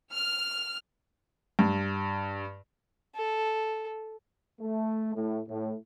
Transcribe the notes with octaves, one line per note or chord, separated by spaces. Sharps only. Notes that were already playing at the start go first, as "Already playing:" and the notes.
F6
G2
A4
A3
A2
A2